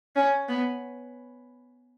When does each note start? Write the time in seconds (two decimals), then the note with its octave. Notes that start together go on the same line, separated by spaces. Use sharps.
0.16 C#4
0.49 B3